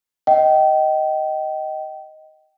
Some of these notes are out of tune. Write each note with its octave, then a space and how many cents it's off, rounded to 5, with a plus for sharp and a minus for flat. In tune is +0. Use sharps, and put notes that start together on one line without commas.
D#5 +5 G5 -25